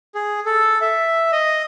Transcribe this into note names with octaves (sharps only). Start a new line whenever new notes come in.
G#4
A4
E5
D#5